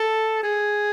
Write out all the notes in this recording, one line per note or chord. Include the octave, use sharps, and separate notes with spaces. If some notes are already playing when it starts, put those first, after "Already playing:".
Already playing: A4
G#4